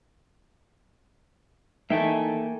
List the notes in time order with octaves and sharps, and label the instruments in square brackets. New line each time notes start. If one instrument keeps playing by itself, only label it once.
[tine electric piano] E3 D#4 E4 [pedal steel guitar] A#3 G5 G#5 [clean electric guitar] A4 E5